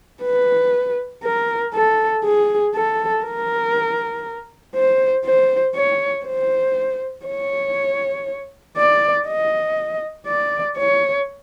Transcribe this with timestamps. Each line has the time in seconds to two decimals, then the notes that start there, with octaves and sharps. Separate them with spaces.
0.23 B4
1.24 A#4
1.74 A4
2.24 G#4
2.75 A4
3.25 A#4
4.75 C5
5.25 C5
5.75 C#5
6.26 C5
7.26 C#5
8.77 D5
9.27 D#5
10.28 D5
10.78 C#5